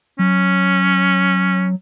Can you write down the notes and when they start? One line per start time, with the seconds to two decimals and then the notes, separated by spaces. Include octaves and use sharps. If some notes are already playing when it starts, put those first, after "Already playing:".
0.19 F#3 C#4